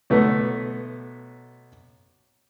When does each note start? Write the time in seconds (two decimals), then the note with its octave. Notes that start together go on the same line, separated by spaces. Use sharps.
0.10 B1 A3 B3